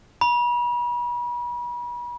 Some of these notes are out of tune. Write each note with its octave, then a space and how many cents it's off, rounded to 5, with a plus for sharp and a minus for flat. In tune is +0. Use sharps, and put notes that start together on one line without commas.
B5 -40